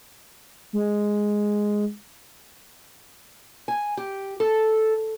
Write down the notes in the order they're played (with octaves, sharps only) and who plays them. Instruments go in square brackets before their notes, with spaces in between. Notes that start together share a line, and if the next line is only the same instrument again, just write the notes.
[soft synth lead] G#3
[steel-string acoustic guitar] G#5
G4
A4